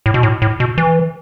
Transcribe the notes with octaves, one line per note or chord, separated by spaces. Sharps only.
A2
B2
A2
A2
B2
E3